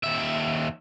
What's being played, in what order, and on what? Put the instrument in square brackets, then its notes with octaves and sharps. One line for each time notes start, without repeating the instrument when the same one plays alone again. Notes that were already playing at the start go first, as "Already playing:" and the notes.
[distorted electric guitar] D#2 E5